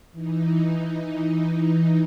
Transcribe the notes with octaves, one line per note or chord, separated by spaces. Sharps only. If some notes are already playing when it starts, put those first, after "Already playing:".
E3 D#4